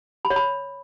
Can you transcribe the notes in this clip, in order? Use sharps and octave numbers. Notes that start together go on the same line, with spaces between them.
B5
C#5
B5